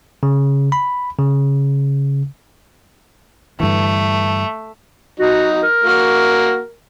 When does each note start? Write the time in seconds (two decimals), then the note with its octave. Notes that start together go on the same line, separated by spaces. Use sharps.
0.23 C#3
0.72 B5
1.19 C#3
3.60 G2 D3 E3 A3
5.19 F#3 D#4 F#4
5.63 A#4
5.84 A#3 F#4